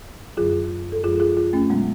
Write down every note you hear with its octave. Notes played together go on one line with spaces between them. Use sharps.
F#2 D3 F#3 F4 G#4
A4
F#2 F3 G#3 F4 G#4
F4 G#4
F4 G#4
A3 C#4
B2 F#3 G#3 B3